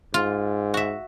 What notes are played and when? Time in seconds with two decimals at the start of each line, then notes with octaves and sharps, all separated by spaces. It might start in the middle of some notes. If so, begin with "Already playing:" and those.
0.14 G#2 F4
0.74 F#4 E5